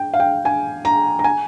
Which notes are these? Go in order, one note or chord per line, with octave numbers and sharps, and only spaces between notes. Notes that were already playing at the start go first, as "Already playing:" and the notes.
Already playing: G5
F5
G5
G#5
A#5
A#5
G#5